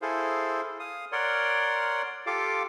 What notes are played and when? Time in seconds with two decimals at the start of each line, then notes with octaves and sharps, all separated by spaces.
0.02 E4 G#4 A4 C5 F5
0.80 F5 D#6
1.12 A#4 C#5 D5 F#5 C6
2.27 F4 G4 A4 F5 D6